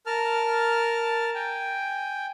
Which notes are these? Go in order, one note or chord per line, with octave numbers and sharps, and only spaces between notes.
A#4 A5 F6
G5 G#5